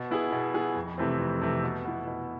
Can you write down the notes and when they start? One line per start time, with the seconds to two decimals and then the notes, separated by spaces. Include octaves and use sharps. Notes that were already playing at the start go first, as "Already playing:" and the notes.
Already playing: B2
0.11 B3 E4 G#4
0.32 B2
0.54 B3 E4 G#4
0.76 F2
0.98 C3 E3 A3 C4
1.19 F2
1.42 C3 E3 A3 C4
1.64 B2
1.85 B3 E4
2.07 B2